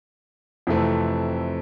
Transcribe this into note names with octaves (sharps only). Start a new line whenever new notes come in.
F2 C3 E3 A3 C4